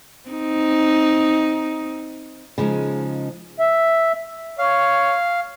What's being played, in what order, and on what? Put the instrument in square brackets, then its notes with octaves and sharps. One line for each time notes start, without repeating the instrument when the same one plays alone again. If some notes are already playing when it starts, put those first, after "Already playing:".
[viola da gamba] C4 D#4
[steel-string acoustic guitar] C#3 F3 G#3 D#4
[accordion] E5
[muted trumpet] C#5 [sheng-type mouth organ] F5